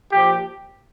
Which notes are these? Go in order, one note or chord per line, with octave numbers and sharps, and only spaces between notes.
A#2 F3 G4